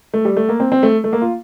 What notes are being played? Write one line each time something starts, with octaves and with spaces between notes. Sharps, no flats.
A3
G3
A3
A#3
C4
C4
A3
A3
A#3
F4